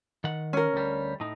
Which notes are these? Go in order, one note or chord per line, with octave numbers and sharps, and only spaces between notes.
D#3 F#5
C#4 A#4
D2 G3
A2 D#4